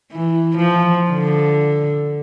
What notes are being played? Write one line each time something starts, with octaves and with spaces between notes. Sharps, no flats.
E3
F3
D3